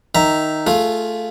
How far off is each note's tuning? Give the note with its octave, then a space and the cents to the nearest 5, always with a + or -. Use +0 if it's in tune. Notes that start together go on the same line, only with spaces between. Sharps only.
D#3 +0 E5 +0 A#5 +0
A3 +0 F4 +0 G#4 +20